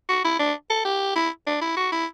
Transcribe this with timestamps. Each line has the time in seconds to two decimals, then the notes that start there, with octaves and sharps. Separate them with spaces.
0.09 F#4
0.24 E4
0.39 D4
0.70 A4
0.85 G4
1.15 E4
1.46 D4
1.61 E4
1.77 F#4
1.92 E4